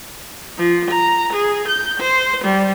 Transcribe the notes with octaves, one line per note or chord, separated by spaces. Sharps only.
F3
A#5
G#4
G6
C5
G3